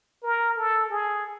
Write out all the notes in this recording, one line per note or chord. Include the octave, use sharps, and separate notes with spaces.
A#4
A4
G#4